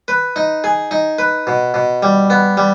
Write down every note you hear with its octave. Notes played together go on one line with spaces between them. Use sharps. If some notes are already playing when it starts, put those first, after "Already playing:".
B4
D#4
G#4
D#4
B4
B2
B2
G3
B3
G3